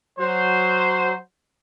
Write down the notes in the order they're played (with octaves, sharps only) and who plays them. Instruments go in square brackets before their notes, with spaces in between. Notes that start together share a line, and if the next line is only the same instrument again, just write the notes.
[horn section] F#3 C5